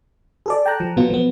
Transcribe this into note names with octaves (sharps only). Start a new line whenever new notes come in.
G#4 A4 D5
G5 A5 A#5 F#6
F3
B2 F#3 B3 F4
F3 B3